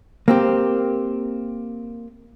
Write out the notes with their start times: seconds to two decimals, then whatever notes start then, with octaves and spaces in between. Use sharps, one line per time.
0.28 A#3 C4 G4